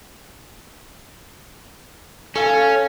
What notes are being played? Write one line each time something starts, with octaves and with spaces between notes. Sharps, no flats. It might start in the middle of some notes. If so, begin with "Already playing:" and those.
C#4 A4 F5 G#5